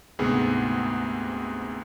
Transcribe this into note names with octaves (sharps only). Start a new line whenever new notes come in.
D2 G#2 C3 B3 G#4